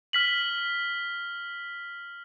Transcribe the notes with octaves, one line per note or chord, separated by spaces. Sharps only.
F6 B6 F#7